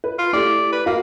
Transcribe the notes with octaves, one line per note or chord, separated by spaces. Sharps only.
B4
F4
A3 E4 G4 D5
B4
A#3 F#4 F5